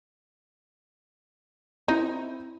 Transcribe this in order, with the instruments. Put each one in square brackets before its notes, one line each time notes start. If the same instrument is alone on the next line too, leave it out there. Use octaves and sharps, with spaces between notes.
[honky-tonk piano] C4 E4 [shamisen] D#4